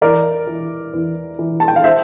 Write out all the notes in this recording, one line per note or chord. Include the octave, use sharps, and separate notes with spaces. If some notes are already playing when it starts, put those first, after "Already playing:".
E2 A#4 D5
E3
E2
E3
A5
G5
F5
C5 E5